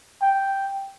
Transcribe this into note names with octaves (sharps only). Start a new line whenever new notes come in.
G5